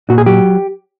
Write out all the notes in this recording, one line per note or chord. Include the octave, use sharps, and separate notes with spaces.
A#2 F#4
G#4
F#3 G4